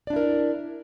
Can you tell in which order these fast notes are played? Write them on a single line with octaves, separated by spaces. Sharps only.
D5 D4 E4 A#4